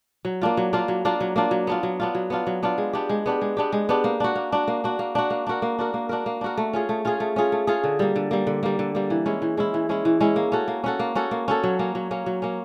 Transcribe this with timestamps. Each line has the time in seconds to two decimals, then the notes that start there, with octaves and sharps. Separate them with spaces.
0.25 F#3
0.42 A#3 D4 F4
0.57 F#3
0.73 A#3 D4 F4
0.88 F#3
1.05 A#3 D4 F4
1.21 F#3
1.36 A#3 D4 F4
1.51 F#3
1.67 B3 D4 F4
1.83 F#3
2.00 B3 D4 F4
2.15 F#3
2.30 B3 D4 F4
2.47 F#3
2.63 B3 D4 F4
2.78 G#3
2.93 B3 D4 G4
3.09 G#3
3.26 B3 D4 G4
3.41 G#3
3.57 B3 D4 G4
3.72 G#3
3.89 B3 D4 G4
4.04 A#3
4.20 D4 F#4
4.35 A#3
4.52 D4 F#4
4.68 A#3
4.84 D4 F#4
4.99 A#3
5.15 D4 F#4
5.30 A#3
5.47 D4 F#4 A#4
5.62 A#3
5.79 D4 F#4 A#4
5.94 A#3
6.09 D4 F#4 A#4
6.26 A#3
6.41 D4 F#4 A#4
6.57 A3
6.73 C#4 F4 G#4
6.89 A3
7.05 C#4 F4 G#4
7.20 A3
7.36 C#4 F4 G#4
7.52 A3
7.67 C#4 F4 G#4
7.84 D3
7.99 G3 A#3
8.16 D3
8.31 G3 A#3
8.47 D3
8.63 G3 A#3
8.79 D3
8.95 G3 A#3
9.10 E3
9.26 G#3 C#4 E4
9.42 E3
9.57 G#3 C#4 E4
9.74 E3
9.89 G#3 C#4 E4
10.05 E3
10.21 G#3 C#4 E4
10.36 A#3
10.52 C#4 F#4 A4
10.68 A#3
10.84 C#4 F#4 A4
10.99 A#3
11.15 C#4 F#4 A4
11.31 A#3
11.48 C#4 F#4 A4
11.63 F#3
11.79 A#3 C#4
11.95 F#3
12.11 A#3 C#4
12.26 F#3
12.42 A#3 C#4